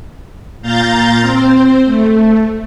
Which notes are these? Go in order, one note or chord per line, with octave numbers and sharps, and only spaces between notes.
A#2 F5 A#5 G6 A6
C4 C5
A3